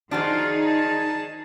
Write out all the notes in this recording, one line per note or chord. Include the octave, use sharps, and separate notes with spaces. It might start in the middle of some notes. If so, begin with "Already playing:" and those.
D#3 D4 D#4 F4 F#4 G#4 C5
A5